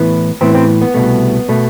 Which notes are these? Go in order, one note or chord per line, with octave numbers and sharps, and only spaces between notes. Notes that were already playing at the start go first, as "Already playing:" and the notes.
Already playing: A2 E3 B3
A2 E3 B3 C4
C4
B3
C2 B2 A3
B2 A3